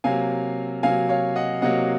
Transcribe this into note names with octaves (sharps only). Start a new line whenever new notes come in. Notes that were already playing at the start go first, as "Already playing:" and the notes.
C3 F#3 A#3 F5 G#5
C3 F#3 A#3 F5 G#5
C#5 F5
D#5 F#5
C3 F#3 A#3 D#5 F#5